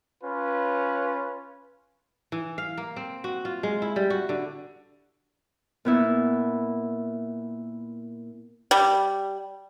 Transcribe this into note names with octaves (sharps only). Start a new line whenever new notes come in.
C#4 F4 B4
E3
F5
A#3
C4
F#4
F4
G#3
E4
G3
F#4
D3
A#2 B3 E4
G3